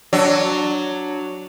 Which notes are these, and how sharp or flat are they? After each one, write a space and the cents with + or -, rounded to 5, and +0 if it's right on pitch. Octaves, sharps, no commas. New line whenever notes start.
F#3 +0 D4 +0